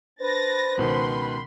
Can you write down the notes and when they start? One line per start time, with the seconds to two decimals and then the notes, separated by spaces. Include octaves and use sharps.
0.21 D4 B4 C5 A6 A#6
0.77 C#2 B2 D#3 B5 C6